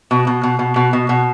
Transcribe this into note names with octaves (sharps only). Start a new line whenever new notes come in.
B2
B2
B2
B2
B2
B2
B2